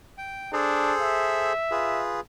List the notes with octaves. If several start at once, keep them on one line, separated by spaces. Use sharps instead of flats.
G5
D4 G#4 A4 C5
E5
F4 G#4 B4